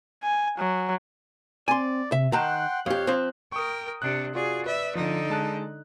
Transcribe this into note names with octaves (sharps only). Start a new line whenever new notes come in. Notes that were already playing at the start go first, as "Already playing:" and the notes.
G#5
F#3
C4 D5 G#5 C6
C3 E5
D#3 F#5 G5 A5 A#5 C6 F#6
F2 G4 C#5 F5
F3 C4
A#4 G5 C#6 D#6
C3 D4 F#6
F4 F#4 G#4 D5
B4 D5 E5
D3 F3 D#4
G#3 A5 F#6